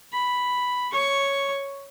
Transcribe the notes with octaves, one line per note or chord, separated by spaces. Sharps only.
B5
C#5 C#6